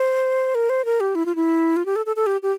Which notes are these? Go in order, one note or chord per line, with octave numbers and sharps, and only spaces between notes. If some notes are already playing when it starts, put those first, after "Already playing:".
Already playing: C5
A#4
C5
A#4
G4
E4
F4
E4
F4
G4
A4
A4
A4
G4
G4